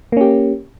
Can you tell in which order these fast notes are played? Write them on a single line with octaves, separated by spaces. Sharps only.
A#3 C#4 G4